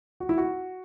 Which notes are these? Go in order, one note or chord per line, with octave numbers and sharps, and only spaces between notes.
F#4
E4
F#4